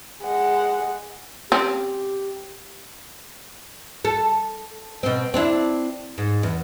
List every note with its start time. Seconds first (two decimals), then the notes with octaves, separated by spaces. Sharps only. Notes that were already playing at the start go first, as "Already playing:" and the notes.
0.23 G#3 F#5
1.52 C4 C#4 G4
4.05 A4
5.03 B2 C4
5.34 C4 D4 E4
6.18 G#2
6.43 E2